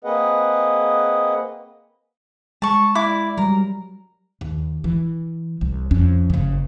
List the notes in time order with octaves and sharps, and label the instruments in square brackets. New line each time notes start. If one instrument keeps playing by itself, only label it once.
[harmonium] A#3 C4 G#4 B4 D#5 F#5
[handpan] G#3 [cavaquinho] A5 C#6
[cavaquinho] E4 D5 D6
[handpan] F#3 G3 [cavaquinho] A#4
[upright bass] D#2
E3
C2
F2 C#4
F#1 C#3